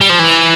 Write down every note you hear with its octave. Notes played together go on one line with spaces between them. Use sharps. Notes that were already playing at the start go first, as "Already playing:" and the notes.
G3
F3
E3